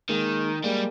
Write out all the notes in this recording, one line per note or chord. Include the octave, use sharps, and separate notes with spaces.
D#3 G#3 A#3
G3 G#3 A#3